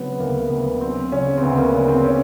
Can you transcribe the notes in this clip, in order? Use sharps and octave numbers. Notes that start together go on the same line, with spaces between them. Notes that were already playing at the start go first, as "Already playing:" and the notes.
Already playing: C#3 F#3 B3 C4
D2 A#3
D2 B3
F#3 C4
C#3 C#4
C4
D2 B3
A#3
C#3 B3
C4
C#4